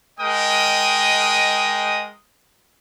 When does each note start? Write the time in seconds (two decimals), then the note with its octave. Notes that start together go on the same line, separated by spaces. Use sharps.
0.19 G#3 A#4 D#5 G5 D#6